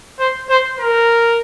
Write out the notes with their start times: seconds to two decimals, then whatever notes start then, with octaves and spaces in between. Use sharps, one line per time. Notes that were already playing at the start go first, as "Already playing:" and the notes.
0.20 C5
0.50 C5
0.79 A#4